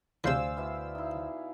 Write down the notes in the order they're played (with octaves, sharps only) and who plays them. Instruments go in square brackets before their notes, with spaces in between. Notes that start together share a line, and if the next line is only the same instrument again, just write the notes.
[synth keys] D2 C5 E6 [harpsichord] C3 E3 [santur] D5 F5 G#5
[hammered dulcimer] B2 E4 E5
D#4 E4